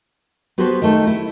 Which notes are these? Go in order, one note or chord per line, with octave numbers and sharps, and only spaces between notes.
B3 F#4 G4 A4 B4 C5
D#3 A3
E4